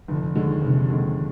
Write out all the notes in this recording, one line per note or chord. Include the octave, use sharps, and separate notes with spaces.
F1 D3
D#2 D3 G#3
F1 C3
D#2 D3 G#3